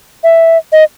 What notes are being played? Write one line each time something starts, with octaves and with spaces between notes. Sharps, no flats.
E5
D#5